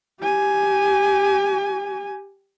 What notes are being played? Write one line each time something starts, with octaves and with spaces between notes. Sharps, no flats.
G4 G#5